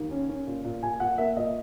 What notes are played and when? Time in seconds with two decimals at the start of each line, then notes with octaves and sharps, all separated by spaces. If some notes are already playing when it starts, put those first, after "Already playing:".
Already playing: D#2
0.11 C#4
0.29 C#4
0.47 A#2
0.64 A#2
0.83 A#2 G#5
1.00 A#2 F#5
1.18 A#3 E5
1.36 A#2 D#5